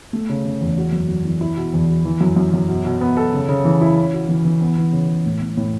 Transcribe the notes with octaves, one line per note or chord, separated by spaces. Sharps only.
A3
C#3
C#3
E2
F#4
F#2
F#2
E3
E4
B2
E2
B2
E3
F#2
F#2
F#2
B2
B2
B3
A4
C#3
C#3
E3
E4
C#4
F#4
E3
E3
B3
E3
C#3
C#3
A2
A2
A2